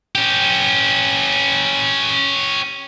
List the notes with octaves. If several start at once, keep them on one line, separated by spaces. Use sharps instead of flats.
C#4 G4